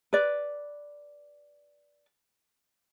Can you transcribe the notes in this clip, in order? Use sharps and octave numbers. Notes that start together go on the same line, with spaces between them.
B4 D5